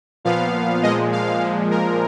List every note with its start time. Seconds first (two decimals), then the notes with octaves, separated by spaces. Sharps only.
0.25 A#2 F3 B3 F5
0.83 A#2 F3 G#3 D#5
1.12 F5
1.41 A#2 F3 G#3
1.71 A#4